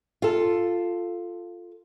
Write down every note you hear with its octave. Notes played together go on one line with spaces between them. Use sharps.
F4 A4